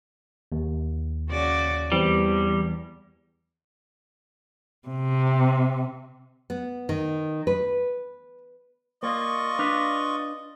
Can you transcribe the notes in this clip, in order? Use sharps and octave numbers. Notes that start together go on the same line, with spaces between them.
D#2
C#3 F#4 D5
E2 E3 G3 C4
C3
B3
D#3
B4
A#3 F4 D5 D#5 C#6
D4 B4 F5